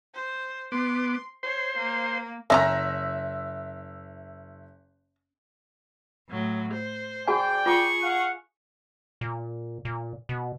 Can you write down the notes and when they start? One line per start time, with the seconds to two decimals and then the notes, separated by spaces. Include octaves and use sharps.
0.14 C5
0.72 B3 C6 D6
1.43 C5 C#5 C6
1.77 A#3
2.50 F#1 C#4 D5 E5 A#5 A#6
6.29 A2 F#3
6.73 C5
7.28 F#4 G#4 D5 G5 G#5
7.66 F4 G#4 B5 C#6 D6
8.02 F5 F#5
9.21 A#2
9.85 A#2
10.29 B2